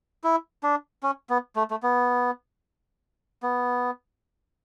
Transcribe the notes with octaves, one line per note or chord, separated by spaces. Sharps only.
E4
D4
C#4
B3
A3
A3
B3
B3